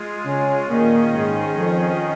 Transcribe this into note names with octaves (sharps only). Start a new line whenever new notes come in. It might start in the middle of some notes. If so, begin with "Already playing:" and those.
Already playing: G#3 F4 G#4
C#3 C#4
A#2 D#3 A#3 C#4 G#4 D#5
G#2 G#3
F2 F3